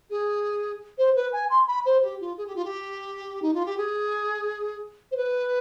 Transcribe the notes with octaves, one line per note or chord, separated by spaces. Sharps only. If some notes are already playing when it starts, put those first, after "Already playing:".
G#4
C5
B4
G#5
C6
B5
C5
G4
F4
G#4
G4
F4
G4
D#4
F4
G4
G#4
C5
B4